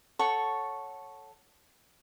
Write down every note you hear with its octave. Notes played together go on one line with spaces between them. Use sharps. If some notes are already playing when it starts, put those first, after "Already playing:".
A4 C#5 F#5 C#6